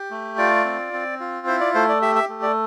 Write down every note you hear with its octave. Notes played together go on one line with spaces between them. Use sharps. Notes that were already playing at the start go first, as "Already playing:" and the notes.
Already playing: G4
A3
F4 D5
C4
C4
F4
E4 C5
D5
A3 C5
D5
G4 E5
E5
A3
D5